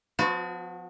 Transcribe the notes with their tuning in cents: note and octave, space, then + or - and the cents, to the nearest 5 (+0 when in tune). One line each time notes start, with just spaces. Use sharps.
F3 +25 B3 +45 F#4 -30